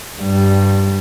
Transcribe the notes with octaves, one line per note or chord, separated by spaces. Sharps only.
G2 G3